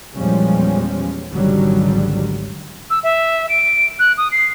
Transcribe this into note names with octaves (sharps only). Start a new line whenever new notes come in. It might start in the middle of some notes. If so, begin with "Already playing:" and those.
E2 A#2 F3 G3 G#3 C#4
G#1 C#2 D3 F#3 G3
E6
E5
D7
F#6
D#6
C7